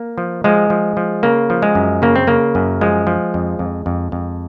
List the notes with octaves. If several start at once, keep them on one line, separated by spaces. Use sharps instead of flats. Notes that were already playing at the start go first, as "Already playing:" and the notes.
Already playing: A#3
F3
F3 G#3
F3
F3
C#3 A#3
F3
G#3
F#2
C#3 A#3
C4
C#3 A#3
F#2
F3 G#3
F3
F2
F2
F2
F2